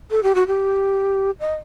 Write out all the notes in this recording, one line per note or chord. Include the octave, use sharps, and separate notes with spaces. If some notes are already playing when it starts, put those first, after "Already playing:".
A4
G4
F#4
G4
D#5